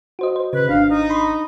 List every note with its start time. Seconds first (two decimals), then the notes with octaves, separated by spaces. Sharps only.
0.19 F#4 C5 D#5
0.36 C5
0.53 C#3 B4
0.69 G#1 D4 F5
0.89 D#4
1.10 B5 C6